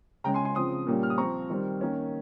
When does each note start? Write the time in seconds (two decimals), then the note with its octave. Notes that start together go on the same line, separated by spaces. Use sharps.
0.24 C#3 G#3 C#4 G5 A#5
0.34 G#5 C6
0.45 G#5 C6
0.55 C#3 F3 C4 C6 D#6
0.87 A#2 G3 A#3 C#4
1.03 F6
1.10 D#6
1.17 F3 C4 A#5 C#6
1.50 D#3 G3 C4
1.81 D#3 A#3 C#4